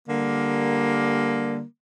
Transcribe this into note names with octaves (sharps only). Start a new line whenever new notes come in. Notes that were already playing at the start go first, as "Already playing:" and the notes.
D3 G3 A#3